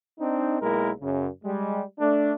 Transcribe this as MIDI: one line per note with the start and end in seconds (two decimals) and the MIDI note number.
0.19 0.59 60
0.19 0.59 62
0.19 0.59 63
0.61 0.91 35
0.61 0.91 56
0.61 0.91 58
0.61 0.91 64
0.61 0.91 70
1.01 1.28 42
1.01 1.28 49
1.44 1.82 55
1.44 1.82 56
1.99 2.32 57
1.99 2.32 62